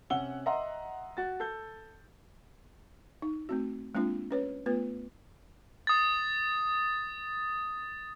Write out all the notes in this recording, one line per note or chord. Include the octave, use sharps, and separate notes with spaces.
C3 C#4 F#5 E6 G7
D#5 E5 F#5 A#5 C6
F#4 A6
A4 G6
D#4
A3 C4 F#4
G#3 A#3 C4 D4 F4
C#4 B4 C#5
A3 B3 F4 B4
D#6 A6